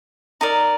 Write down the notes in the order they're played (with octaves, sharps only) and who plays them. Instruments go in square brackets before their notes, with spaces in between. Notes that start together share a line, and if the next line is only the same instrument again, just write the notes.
[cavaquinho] D#4 A#4 D5